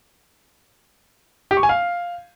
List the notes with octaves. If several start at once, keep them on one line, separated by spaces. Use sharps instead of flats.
G4
C#6
G#5
F5